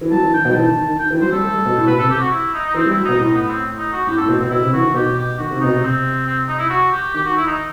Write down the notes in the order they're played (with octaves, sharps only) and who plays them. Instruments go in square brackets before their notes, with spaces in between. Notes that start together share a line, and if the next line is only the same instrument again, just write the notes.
[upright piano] E3
[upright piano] F#3 [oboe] A5
[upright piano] E3
[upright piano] D#3 [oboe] G5
[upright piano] B2
[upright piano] F#3 [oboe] G5
[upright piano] E3 [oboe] A5
[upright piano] D#3
D#3
D#3
[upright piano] D#3 [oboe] G5
[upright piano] E3
[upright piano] F#3 [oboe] C5
[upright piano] G3 [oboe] A4
[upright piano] A3
G3
B2
A2
[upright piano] B2 [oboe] B4
[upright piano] C3 [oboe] A4
[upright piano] C3 [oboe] G4
[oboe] F#4
E4
D#4
D#4
[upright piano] E3 [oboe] C4
[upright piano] G3
[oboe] E4
[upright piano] F#3
[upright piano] B2 [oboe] D#4
[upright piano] A2 [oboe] D#4
[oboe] B3
C4
D#4
F#4
[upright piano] A2 [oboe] G4
[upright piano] A2 [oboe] A4
[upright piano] B2 [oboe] C4
[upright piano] B2 [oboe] C4
[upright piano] B2 [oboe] E4
[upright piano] C3
[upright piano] E3 [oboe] F#4
[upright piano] D#3
[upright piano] B2 [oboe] G4
[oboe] G4
[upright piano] D#3 [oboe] F#4
[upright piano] C3
[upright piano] B2 [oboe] D#4
[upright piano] C3
[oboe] C4
C4
D#4
E4
F#4
G4
[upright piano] D#3 [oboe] G4
[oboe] F#4
E4
D#4